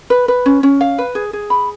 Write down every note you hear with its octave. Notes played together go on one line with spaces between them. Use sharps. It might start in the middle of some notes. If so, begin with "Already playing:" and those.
B4
B4
C#4
C#4
F5
B4
G#4
G#4
B5